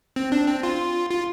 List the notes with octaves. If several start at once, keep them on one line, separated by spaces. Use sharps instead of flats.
C4
D4
C4
F4
F4